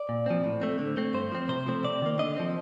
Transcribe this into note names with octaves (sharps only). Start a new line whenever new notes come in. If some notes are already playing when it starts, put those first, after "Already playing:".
Already playing: D5
A#2
F3 C4
A2
A3 C4
D3
A3 C4
G2 C5
F3 C4
C3 C5
F3 A3 C4
C3 D5
D#3 A#3
D3 D#5
F3 C4